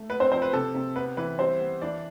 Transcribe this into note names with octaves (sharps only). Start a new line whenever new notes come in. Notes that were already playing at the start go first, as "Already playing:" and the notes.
Already playing: A3
B3 B4
C4 C5
F3 C4 C5
B4
C3 A4
C3
B3 B4
E3 B4
G3 C4 C5
B3
E3 D4 D5